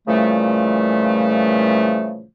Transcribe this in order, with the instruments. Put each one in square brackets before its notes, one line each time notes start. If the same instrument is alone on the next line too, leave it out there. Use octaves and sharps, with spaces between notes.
[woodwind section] A#2 C#3 E3 F3 G3 A3